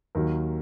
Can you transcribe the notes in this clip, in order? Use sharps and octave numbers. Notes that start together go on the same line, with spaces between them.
D#2 D#3 F#3 A#4